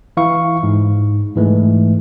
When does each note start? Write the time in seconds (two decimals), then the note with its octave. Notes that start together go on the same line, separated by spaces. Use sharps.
0.17 E3 E4 F5 C#6
0.63 G#2
1.36 G#2 E3 G#3 A3